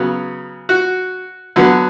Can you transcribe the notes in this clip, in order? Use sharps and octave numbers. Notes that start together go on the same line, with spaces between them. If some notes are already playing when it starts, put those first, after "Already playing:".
Already playing: C#3 F#3 B3
F#4
D3 F#3 B3